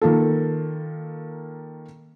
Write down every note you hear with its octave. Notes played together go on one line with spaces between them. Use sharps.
D#3 A#3 F4 A4